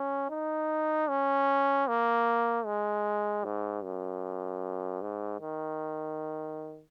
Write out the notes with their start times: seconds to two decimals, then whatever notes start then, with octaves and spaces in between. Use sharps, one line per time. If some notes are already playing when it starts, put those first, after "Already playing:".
Already playing: C#4
0.30 D#4
1.08 C#4
1.88 A#3
2.66 G#3
3.44 G#2
3.84 F#2
5.02 G#2
5.41 D#3